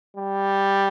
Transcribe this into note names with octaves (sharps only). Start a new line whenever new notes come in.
G3